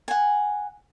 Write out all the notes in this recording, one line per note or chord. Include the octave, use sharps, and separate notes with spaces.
F#5 G#5